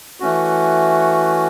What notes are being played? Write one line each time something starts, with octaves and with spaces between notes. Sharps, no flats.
E3 A3 C#4 F#4